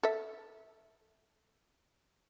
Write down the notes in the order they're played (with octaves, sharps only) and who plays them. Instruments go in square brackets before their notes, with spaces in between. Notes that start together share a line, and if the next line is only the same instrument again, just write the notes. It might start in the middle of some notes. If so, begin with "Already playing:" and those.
[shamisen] A4 E5